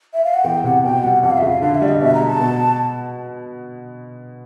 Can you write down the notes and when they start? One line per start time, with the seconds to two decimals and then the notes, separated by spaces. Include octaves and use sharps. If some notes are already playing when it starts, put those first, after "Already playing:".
0.14 E5
0.24 F5
0.34 F#5
0.44 E2 G5
0.64 C3 F#5
0.83 B2 G5
1.03 G3 F#5
1.23 F2 F#5
1.30 F5
1.38 E5
1.42 C#3 F5
1.62 D3 F5
1.75 E5
1.81 G3 D5
1.88 D#5
2.01 B2 E5
2.14 A#5
2.20 G#3
2.27 A5
2.40 B2